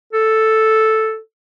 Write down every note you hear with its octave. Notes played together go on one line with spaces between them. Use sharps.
A4